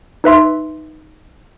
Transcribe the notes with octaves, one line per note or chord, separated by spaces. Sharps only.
D#4 B4 E5 C6